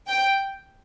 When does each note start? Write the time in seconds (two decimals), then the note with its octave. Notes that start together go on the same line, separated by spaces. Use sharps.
0.08 G5